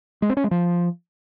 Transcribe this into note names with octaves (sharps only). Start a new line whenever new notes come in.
G#3
C4
C#4
G#3
F3